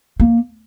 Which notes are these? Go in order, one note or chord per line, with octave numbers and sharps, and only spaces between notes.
A#3